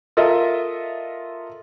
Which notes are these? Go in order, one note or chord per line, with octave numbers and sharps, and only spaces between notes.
F4 A4 A#4 D#5 E5